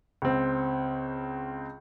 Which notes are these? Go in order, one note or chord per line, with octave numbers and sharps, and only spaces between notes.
C#2 C4